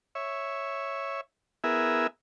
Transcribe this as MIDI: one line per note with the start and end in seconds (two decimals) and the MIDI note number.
0.15 1.21 73
0.15 1.21 76
1.64 2.07 59
1.64 2.07 64
1.64 2.07 68
1.64 2.07 70
1.64 2.07 76